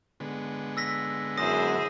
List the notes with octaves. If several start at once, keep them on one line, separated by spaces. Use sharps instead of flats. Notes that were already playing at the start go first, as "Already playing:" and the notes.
D3 G#3 B3
E6 A#6 B6
F#2 E4 G#4 C5 D#6 A#6